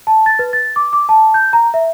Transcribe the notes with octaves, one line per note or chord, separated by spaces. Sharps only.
A5
A6
B4
A6
D6
D6
A5
G6
A#5
E5